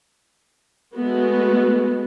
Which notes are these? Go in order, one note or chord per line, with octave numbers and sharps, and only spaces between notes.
G#3 A3 B3 F#4